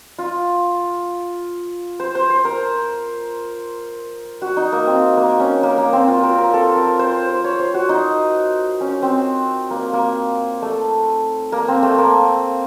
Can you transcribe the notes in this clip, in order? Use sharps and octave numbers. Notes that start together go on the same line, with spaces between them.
F4
C5
C5
C5
A#4
F#4
D#4
A#3
C4
A#3
C#4
A#3
A#3
C4
F4
A#4
A#4
A4
A#4
C5
C5
C#5
C5
F#4
D#4
C#4
C4
A#3
A#3
A3
A#3
C4
A3
A#3